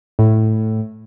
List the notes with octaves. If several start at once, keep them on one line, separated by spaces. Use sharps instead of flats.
A2